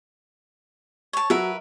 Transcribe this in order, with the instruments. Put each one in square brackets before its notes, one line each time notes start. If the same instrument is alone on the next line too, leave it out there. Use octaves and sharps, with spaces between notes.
[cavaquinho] C#5 A5
[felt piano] F#3 [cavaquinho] A#4 B4 E5